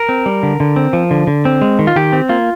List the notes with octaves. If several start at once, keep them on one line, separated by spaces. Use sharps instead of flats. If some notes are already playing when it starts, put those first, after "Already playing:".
Already playing: A#4
C4
G3
D3
D3
C4
F3
D3
D3
C4
G#3
D#3
F4
D#3 G4
C4
A#3 F4